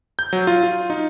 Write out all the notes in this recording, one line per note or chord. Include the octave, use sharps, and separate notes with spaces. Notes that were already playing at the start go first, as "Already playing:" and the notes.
G6
F#3
F4
F4
D#4